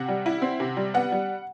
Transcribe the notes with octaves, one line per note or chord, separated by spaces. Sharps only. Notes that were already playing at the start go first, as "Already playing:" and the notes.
Already playing: C3 F#5
G3
E4
C4
C3
G3
B3 F#5
G3